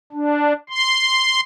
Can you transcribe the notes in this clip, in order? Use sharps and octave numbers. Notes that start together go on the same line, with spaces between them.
D4
C6